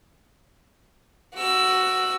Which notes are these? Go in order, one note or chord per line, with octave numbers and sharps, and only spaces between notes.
F#4 E6